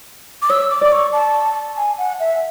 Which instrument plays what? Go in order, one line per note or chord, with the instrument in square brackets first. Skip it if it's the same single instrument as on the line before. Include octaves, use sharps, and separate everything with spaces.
[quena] D6
[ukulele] C#5 [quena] E6
[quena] D6
[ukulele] D5 [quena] D6
[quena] C#6
A5
G#5
F#5
E5